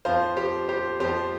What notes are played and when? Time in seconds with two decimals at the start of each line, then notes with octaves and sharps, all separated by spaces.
0.05 F2 F3 C5 F5
0.37 G4 C5
0.69 G4 C5
1.00 F2 F3 G4 C5